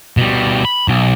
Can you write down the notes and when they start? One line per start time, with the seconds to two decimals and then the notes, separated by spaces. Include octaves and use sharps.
0.17 B2 G3
0.65 B5
0.88 B1